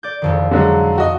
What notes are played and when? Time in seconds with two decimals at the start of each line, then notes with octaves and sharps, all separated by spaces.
0.03 D5 G6
0.22 E1 F2 D#3
0.51 D3 F#3 G#3
0.98 F#4 D#5